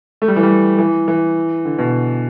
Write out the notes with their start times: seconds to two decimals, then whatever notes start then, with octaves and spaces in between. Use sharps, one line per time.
0.22 A3
0.28 G3
0.36 E3
0.43 G3
0.79 E3
1.08 E3
1.65 D3
1.79 B2